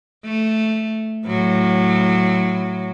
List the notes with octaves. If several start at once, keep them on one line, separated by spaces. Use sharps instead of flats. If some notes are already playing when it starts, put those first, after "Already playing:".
A3
A2 F#3